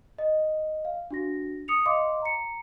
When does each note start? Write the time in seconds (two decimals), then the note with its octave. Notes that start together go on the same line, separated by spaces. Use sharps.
0.18 D#5
0.85 F5
1.11 D4 F#4 A#6
1.68 D#6 C#7 F7
1.86 D#5 F5 C6 D6
2.22 A#5 C#7